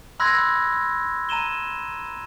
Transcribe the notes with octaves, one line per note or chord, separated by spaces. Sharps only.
B5 C6 E6 F#6 G#6 A#6
A#5 D#7 E7 G7